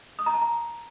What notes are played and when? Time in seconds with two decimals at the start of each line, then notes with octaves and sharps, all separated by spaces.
0.19 D#6
0.26 A#5
0.34 A5
0.41 A#5